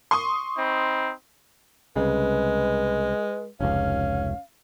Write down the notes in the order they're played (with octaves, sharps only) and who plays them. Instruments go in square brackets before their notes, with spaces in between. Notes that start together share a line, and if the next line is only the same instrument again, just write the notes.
[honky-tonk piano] C6 C#6 D#6
[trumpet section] C4 D#4 B5
[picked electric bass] C2 C#3 [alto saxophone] G#3 [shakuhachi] B4
[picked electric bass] F1 C#2 [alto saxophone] C#4 [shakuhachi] F5